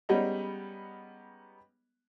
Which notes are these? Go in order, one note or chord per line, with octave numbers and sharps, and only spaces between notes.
G3 G#3 B3 C#4 D#4